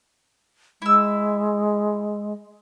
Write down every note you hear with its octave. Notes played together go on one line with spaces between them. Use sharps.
G#3 E4 E6